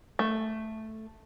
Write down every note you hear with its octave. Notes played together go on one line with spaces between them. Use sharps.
A3